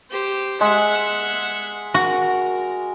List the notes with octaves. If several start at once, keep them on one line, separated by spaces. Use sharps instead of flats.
G4 C5
G#3 E5 F#5
F#4 A#4